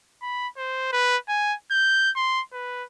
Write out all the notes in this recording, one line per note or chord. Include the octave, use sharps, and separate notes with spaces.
B5
C5
B4
G#5
G6
C6
B4